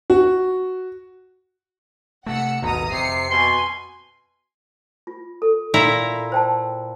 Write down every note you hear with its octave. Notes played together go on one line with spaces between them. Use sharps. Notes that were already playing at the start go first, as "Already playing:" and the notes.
F#4
C3 A3 F#5 E6 C#7
D#1 G#1 D#2 B2 A#5 D#6
F2 C3 C7 C#7
B2 G#5 C6
F4
A4
A#2 E4 A#5 B5
C5 G5 A5